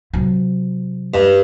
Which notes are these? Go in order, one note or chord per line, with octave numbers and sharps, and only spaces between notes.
C3 F#3
G2